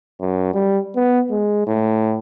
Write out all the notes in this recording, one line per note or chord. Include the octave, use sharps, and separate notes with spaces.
F#2
G3
B3
G#3
A2